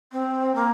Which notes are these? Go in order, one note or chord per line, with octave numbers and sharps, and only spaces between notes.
C4
A#3